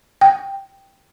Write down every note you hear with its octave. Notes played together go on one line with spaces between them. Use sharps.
G5